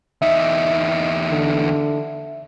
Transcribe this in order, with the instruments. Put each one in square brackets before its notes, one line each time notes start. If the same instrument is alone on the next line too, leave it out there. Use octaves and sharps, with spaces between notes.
[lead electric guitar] E2 D#4 [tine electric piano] E5
[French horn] D3